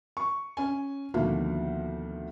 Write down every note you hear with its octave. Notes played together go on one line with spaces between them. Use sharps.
C#6
C#4 G#5
D2 B2 D#3 F3 A#3